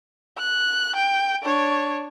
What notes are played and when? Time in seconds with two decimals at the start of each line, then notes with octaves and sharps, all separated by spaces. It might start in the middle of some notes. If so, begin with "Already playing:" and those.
0.38 F#6
0.96 G5
1.43 D4 C#5